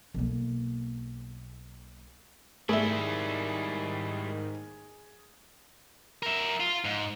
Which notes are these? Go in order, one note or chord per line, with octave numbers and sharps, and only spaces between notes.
B1 A#3
G#2 D#3 G3 A3 E4 G#4 E5
A#4 E5
F4
G#2